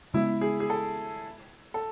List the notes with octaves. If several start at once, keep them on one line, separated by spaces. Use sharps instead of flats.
C#3 G#3 B3 E4
G#4
G#4
A4
A4